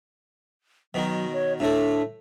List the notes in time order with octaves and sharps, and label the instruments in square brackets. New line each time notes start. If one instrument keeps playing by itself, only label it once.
[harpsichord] B2 D#3 [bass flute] F#3
[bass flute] C#5
[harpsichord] A2 A3 [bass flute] D4